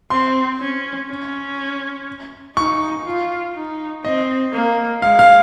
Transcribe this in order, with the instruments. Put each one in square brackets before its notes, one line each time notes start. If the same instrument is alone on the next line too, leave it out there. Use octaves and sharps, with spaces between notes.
[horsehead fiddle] C4 [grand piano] C6
[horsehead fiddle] C#4
C#4
[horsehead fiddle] D#4 [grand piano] C#6
[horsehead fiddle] F4
D#4
[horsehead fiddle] C4 [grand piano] D#5
[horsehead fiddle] A#3
[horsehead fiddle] G#3 [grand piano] F5
[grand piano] F5